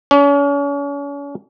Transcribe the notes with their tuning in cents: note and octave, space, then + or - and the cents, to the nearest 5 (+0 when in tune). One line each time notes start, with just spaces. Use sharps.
C#4 +40